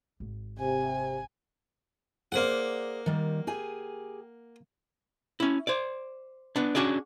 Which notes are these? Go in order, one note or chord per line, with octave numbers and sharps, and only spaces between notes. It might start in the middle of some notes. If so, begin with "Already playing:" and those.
G#1
C3 G#5
A#3 G#4 C5 D5 F#5
D#3 G3
G4 G#4 G#5
C#4 E4
C5 D5
B3 D4
C#4 D4 F#4 G#4 D5